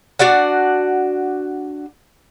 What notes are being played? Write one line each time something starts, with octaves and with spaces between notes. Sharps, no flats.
D4 F#4 D5 F#5